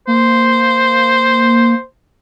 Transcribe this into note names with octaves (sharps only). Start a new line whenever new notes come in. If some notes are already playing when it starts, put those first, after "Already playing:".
A#3 C5